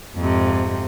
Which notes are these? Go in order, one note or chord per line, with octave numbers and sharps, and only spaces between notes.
F2 G#2 C3